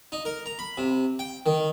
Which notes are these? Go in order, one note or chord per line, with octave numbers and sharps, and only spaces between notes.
D#4
A#4
A#5
B5
C3
G5
D#3